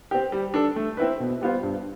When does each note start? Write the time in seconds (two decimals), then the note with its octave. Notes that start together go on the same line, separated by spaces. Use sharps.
0.11 C4 G4
0.32 G3
0.54 D4 A4
0.76 A3
0.97 C4 E4 B4
1.20 B2
1.41 G3 B3 F4 C5
1.63 G2